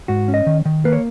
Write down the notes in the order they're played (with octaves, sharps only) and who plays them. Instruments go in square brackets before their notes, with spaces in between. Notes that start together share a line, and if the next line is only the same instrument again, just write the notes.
[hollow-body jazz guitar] G#2 F#4
C#4
D#5
D#3
D#3
A#3 B4
C#5